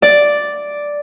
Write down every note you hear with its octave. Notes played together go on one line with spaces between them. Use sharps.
D5